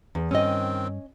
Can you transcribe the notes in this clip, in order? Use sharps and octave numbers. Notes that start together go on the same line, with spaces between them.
E2
G2 D#3 C4 C#4 D#5